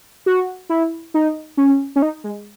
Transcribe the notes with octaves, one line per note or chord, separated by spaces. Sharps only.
F#4
E4
D#4
C#4
C#4
D#4
G#3